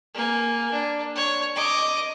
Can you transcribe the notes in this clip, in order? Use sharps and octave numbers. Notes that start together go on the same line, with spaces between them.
A#3 G#5
D4
C#5
D#5 D6